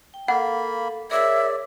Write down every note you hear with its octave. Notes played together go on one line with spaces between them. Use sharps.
G5
A#3 A4 F5 F#5 B5
G#4 A#4 C#5 D5 E5